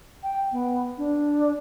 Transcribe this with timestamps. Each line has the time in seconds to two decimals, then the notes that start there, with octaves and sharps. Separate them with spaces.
0.23 G5
0.52 B3
0.98 D4